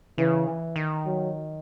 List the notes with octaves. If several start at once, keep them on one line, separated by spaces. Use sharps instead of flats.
C#3 E3
E3
D#3
F#3